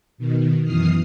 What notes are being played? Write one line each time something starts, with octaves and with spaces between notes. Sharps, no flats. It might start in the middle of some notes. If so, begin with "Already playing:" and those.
B2 D#3
F#2 B2 E3 D#6 F6 C7